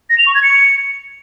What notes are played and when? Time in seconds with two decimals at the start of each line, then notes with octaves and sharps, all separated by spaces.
0.10 A#6
0.18 F7
0.26 C#6
0.35 G#6
0.43 C#7